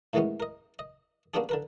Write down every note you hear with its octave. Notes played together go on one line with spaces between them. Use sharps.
A2 D#3 E3 G#3 B3 C#4
A#4 D#5
D#5
A#3 B3 C#4 D4 G4 G#4
D3 A#4 B4